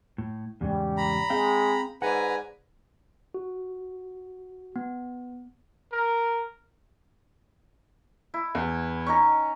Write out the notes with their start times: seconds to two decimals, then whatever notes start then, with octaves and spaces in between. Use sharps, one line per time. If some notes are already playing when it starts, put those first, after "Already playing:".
0.18 A2
0.61 E2 G#2 C#3 G3
0.97 A#5 B5
1.30 G#3 C4 F5 G5
2.02 G#2 B4 D5 F#5 G#5 A#5
3.34 F#4
4.76 B3
5.92 A#4
8.34 E4
8.55 E2
9.07 C#4 D#4 A#5 C#6